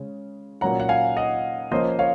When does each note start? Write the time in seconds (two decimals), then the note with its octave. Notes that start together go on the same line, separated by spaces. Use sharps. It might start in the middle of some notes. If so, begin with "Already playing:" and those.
Already playing: C#3 G#3 C#4
0.61 A#2 F#3 C#4 F#5 A#5
0.80 F#5
0.89 F5 G#5
1.17 D#5 F#5
1.71 F3 A#3 C#4 C5 D#5
1.99 C#5 F5